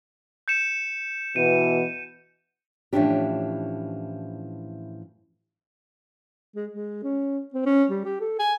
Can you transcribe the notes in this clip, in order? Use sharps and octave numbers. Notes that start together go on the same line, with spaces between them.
G6 C#7 E7
B2 E3 D#7
A2 E3 F3 C#4 D4 G4
G#3
G#3
C#4
C4
C#4
G3
G4
A4
G#5